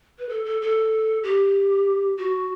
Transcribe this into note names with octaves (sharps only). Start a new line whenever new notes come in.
B4
A4
A4
A4
G4
F#4